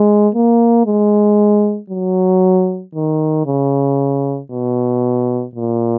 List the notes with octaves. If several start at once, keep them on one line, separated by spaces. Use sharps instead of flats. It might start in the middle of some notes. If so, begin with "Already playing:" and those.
Already playing: G#3
A#3
G#3
F#3
D#3
C#3
B2
A#2